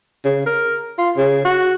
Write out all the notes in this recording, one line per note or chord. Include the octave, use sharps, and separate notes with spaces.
C#3
A#4
F4
C#3
F#4